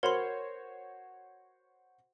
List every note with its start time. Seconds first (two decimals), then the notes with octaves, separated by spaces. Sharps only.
0.03 F#4 A#4 C5 C#5 B5 C6